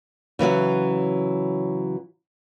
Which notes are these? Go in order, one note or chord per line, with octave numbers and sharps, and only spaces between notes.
C#3 E3 F#3 F#5